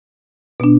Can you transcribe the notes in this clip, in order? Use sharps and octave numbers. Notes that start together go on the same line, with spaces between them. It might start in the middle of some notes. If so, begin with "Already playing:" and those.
B2 B3 D4